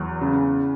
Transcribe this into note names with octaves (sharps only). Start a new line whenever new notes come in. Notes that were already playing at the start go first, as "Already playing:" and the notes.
Already playing: E2 F#3
C#3